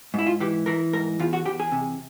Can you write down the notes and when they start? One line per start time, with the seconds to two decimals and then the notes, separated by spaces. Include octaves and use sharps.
0.14 G#2 E4
0.27 F4
0.40 E3 G4
0.66 E3 A#4
0.93 G#2 A#4
1.19 E2 F4
1.33 F#4
1.46 E2 G4
1.60 G#4
1.72 C3